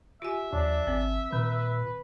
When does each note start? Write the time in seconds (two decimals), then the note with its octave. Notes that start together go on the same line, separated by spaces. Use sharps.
0.22 F4 G4 E5 G#5
0.53 D#2 F3 D4
0.87 G#1 C4
1.33 A#2 D#3 B4